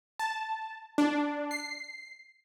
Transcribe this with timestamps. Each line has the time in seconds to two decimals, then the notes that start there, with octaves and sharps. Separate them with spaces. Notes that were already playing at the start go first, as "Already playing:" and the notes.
0.19 A5
0.98 D4
1.51 C7